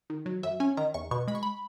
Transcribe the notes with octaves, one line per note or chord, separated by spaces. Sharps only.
D#3
F#3
F#2 E5
C#4 G#5
D#3 A#5
E2 C#6
B2 C#6
G#3 B5
C#6
B5